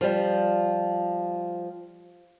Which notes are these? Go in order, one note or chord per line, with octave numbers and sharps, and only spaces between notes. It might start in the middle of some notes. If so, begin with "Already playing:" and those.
F3 G3